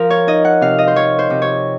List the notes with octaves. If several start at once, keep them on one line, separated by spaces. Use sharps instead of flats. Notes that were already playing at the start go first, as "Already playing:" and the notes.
Already playing: F3 A#4 F5
C#5
D#4 D#5
F#5
C3 F5
D#5
C5
F3 C#5
C5
C3
C#5